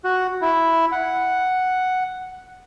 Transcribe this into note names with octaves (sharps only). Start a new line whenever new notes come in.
F#4
E4
F#5